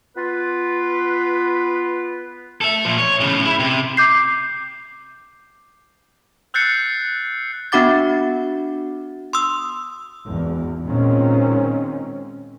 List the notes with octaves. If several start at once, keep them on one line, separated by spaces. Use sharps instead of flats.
B3 F4 B4
A4 E5
A#2 F3
C#5
A2 C#3
E4
C3
D6 G6 C7
E6 F#6 G6 A6 C7 C#7
B3 D4 F#4 F#5 D6 A6
C6 D#6 E6
G#1 E2
A#2 D#3 G#3 C4 C#4